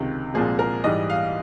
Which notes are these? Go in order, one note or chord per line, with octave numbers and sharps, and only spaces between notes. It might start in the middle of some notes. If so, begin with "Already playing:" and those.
Already playing: C#2 C3 D#3
C2 A#2 F3 G#3 G#4
A#4
G#2 E3 G3 D#5
F5